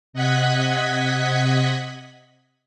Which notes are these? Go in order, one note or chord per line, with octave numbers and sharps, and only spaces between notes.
C3 D#5 F#5 F#6 G#6 B6